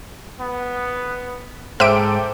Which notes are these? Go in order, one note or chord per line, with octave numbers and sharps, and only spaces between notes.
B3
G#2 A4 C5 E5 G5 D6 D7